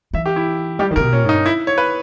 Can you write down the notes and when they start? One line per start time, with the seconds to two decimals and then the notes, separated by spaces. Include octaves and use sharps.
0.13 E3 E5
0.26 G4
0.36 E4
0.79 G3 G4
0.91 D#3
0.96 C#3 A#4
1.01 B2
1.13 A#2 C#4
1.23 G#2
1.29 D#4
1.34 G2
1.46 E4
1.67 C#5
1.78 B4